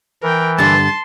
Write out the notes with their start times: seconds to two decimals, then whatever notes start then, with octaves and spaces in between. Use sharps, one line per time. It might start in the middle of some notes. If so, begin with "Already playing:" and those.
0.23 E3 A#4 G5
0.58 G2 D3 A5 C6 A6